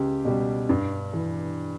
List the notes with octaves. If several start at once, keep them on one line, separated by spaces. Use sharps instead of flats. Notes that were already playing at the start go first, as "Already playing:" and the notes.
Already playing: C#2 G4
B2 G3
G2
E3